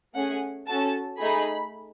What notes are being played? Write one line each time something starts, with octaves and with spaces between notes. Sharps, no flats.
A3 C#4 G#4 F#5
C#4 F#4 A4 A5
A3 D#4 G#4 B5